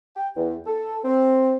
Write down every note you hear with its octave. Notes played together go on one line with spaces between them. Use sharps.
G5
E2
A4
C4